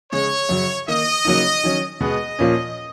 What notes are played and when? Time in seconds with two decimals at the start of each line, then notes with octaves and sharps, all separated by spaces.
0.11 C#3 G#3 C#4 C#5
0.49 F#2 C#3 F#3
0.88 D#3 A#3 D#4 D#5
1.25 C#3 F#3 A#3 D#4
1.64 D#3 F#3 C#4
2.01 B2 G#3 B3 D#5
2.39 A#2 F3 A#3 C#4